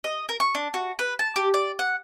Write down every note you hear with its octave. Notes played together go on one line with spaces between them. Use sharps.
D#5
A#4
C#6
D4
F#4
B4
A5
G4
D5
F#5